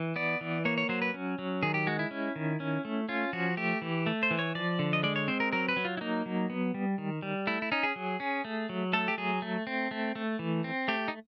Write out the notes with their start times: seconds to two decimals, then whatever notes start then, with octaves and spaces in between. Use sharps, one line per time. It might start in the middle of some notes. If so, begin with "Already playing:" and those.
Already playing: E3
0.16 B3 D5
0.41 E3
0.65 A#3 C#5
0.78 C#5
0.89 F#3 C5
1.02 B4
1.14 C#4
1.39 F#3
1.63 D#3 G#4
1.74 G4
1.87 G#3 F#4
1.99 E4
2.11 C#4
2.36 D#3
2.60 C#4
2.85 A3
3.09 C#4 F4
3.33 F3 F#4
3.57 A3 G4
3.82 E3
4.06 A3
4.23 C5
4.31 E3
4.39 C#5
4.55 F3 D5
4.79 D3
4.93 D#5
5.03 G#3 D5
5.16 C#5
5.28 C4 C5
5.40 A#4
5.52 F#3 A#4
5.69 B4
5.77 F#3
5.85 F4
5.97 E4
6.01 A#3 D#4
6.26 F#3
6.50 B3
6.74 G3
6.98 D#3
7.22 G3
7.47 A3 E4
7.62 E4
7.72 C#4 D#4
7.83 G#4
7.96 F#3
8.20 C#4
8.45 A3
8.69 F#3
8.93 A3 A4
9.08 G4
9.18 F#3 G#4
9.42 A3
9.67 C4
9.91 A3
10.15 A3
10.39 E3
10.64 C4
10.88 A3 G4
11.08 D#4